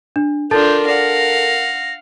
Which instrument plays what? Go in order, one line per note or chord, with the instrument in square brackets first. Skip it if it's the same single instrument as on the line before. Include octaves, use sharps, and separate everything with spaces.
[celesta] D4
[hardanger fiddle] D4 F4 [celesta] A4 A5 A6 [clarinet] A#4 [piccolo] G6
[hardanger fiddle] F5 F#5 [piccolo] A#6